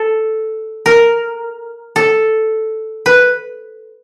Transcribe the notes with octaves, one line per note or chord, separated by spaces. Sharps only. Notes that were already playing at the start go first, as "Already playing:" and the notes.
Already playing: A4
A#4
A4
B4